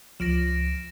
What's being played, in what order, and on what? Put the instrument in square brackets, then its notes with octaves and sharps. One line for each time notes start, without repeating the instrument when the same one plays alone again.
[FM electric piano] C#2 F3 [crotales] A#6 D7 E7